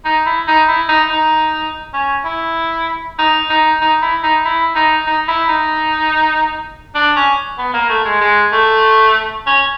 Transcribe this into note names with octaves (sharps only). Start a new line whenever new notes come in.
D#4
E4
D#4
E4
D#4
D#4
C#4
E4
D#4
D#4
D#4
E4
D#4
E4
D#4
D#4
E4
D#4
D4
C#4
B3
A#3
A3
G#3
G#3
A3
C#4